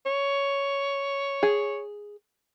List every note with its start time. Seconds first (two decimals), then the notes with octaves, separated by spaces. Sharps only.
0.06 C#5
1.43 G#4